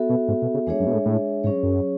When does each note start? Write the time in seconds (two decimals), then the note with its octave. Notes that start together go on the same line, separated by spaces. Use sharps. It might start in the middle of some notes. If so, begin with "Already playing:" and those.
Already playing: B3 F#4 A4 E5
0.09 B2
0.28 G#2
0.42 B2
0.54 C#3
0.67 E2 G#3 D4 G#4 C#5 E5
0.79 F#2
0.87 B2
0.93 A2
1.05 A2
1.44 G#2 F#3 C#4 G#4 C#5
1.63 F#2